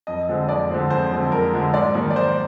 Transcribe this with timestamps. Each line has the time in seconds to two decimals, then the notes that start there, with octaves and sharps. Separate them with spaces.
0.07 F2 D#5
0.29 D3 F3 G#3 C4
0.49 F2 D5
0.70 D3 F3 G#3 C4
0.90 F2 C5
1.12 D3 F3 G#3 C4
1.32 F2 A#4
1.54 D3 F3 G#3 C4
1.74 G#2 D5
1.94 D#3 G3 A#3
2.10 D5
2.15 G#2 C5